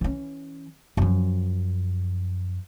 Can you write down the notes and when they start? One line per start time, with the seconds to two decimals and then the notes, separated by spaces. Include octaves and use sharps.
0.01 E3 C#4
0.97 F#2 F3